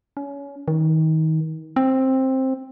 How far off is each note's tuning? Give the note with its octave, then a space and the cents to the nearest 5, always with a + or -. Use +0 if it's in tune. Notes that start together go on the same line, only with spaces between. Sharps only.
C#4 +25
D#3 +30
C4 +10